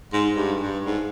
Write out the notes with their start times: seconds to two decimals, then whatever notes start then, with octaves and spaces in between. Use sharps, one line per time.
0.13 G#2
0.36 G2
0.61 G2
0.85 G#2